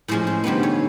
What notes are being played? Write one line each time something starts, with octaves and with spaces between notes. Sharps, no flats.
A2 F3 G#3 C#4 C5
C5
D3 G3 B3 D#4 C5
C#5